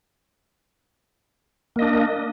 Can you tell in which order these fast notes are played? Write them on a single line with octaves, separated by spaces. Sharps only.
A#3 D#5 D4